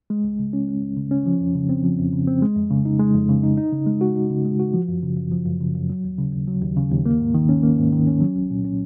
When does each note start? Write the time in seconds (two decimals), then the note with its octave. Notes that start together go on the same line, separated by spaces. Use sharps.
0.10 G#3
0.24 C#2
0.39 C#3
0.53 C#4
0.68 G#3
0.82 C#2
0.97 C#3
1.11 C#4
1.26 F3
1.40 F2
1.55 C#3
1.69 C4
1.84 F3
1.98 F2
2.13 C#3
2.27 C4
2.42 G#3
2.56 F2
2.71 C#3
2.85 D#4
3.00 G#3
3.14 F2
3.29 C#3
3.43 D#4
3.58 D#4
3.72 C#3
3.87 G#3
4.01 F#4
4.15 D#4
4.30 C#3
4.45 G#3
4.59 F#4
4.74 F3
4.88 F#2
5.03 C#3
5.17 F#2
5.32 F3
5.46 F#2
5.60 C#3
5.75 F#2
5.90 F#3
6.04 D#2
6.18 C#3
6.33 D#2
6.48 F#3
6.62 D#2
6.76 C#3
6.91 D#2
7.06 A#3
7.20 G#2
7.34 D#3
7.49 C#4
7.63 A#3
7.78 G#2
7.92 D#3
8.07 C#4
8.21 F#3
8.36 C2
8.51 A#2
8.65 C#4